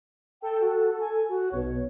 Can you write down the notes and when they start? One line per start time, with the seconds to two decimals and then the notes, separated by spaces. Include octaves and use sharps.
0.42 A4 G5
0.61 F#4
1.00 G#5
1.29 F#4
1.51 B1 B2 C#5